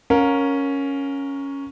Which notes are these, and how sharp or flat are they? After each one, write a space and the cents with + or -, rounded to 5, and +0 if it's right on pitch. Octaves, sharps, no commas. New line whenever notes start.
C#4 +0 A#4 +0 F5 +40